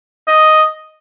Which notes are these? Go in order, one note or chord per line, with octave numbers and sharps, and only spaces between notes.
D#5